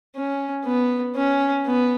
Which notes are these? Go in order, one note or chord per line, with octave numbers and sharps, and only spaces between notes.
C#4
B3
C#4
B3